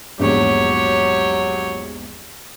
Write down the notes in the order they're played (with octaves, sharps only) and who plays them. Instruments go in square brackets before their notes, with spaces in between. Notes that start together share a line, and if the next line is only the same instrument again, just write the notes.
[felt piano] A#1 E2 G#2 [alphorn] F#3 [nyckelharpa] G4 C#5